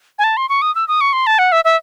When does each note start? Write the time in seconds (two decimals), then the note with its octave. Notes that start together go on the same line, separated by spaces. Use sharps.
0.19 G#5
0.24 A5
0.37 C6
0.49 C#6
0.62 D#6
0.75 E6
0.88 D#6
1.01 C#6
1.13 C6
1.27 A5
1.39 F#5
1.52 E5
1.65 E5